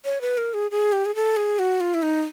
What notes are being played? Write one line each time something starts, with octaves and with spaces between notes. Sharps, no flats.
C#5
B4
A#4
G#4
G#4
G4
G#4
A4
G#4
F#4
F4
E4
D#4